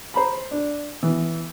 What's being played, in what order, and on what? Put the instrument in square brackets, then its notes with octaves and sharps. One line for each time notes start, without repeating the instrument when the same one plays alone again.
[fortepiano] C5 A#5 B5
D4
E3 B3